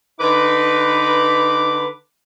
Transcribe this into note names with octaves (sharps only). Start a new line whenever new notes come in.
D3 D#4 B4 D6